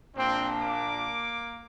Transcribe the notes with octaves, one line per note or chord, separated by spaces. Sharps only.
A#1 A#2 C4 D4
A#3 D6